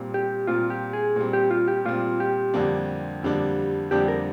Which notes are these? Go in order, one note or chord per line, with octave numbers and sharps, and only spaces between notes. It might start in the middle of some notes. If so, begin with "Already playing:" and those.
Already playing: A#2 G3 C4
G4
A#2 G3 C4 F4
G4
G#4
A#2 G3 C4
G4
F4
G4
A#2 G3 C4 F4
G4
F2 D3 G3 A#3 D4
F2 D3 G3 A#3 D4
F2 D3 G3 A#3 D4 G4
A#4